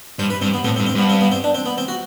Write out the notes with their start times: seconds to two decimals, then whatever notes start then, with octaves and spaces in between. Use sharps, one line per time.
0.19 G2 C5
0.30 B4
0.42 G2 C4
0.54 B3
0.64 A2 C4
0.76 C4
0.80 G2
0.87 C4
0.95 G2 B3
1.10 C4
1.21 B3
1.32 C4
1.44 D4
1.55 C4
1.66 B3
1.78 C4
1.88 F#4